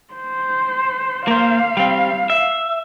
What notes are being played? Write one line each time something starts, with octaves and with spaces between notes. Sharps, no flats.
C5
A#3 C5 F5
G3 C4
E5